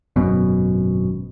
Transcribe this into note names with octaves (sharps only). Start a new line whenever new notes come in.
G#1 F#2 B2